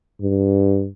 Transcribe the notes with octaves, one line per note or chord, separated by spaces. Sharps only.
G2